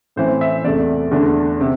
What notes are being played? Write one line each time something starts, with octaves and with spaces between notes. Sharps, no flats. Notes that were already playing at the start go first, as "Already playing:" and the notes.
A2 E3 C4 C5
E5
E2 C3 A3 D5
E2 D3 A3 D4
C3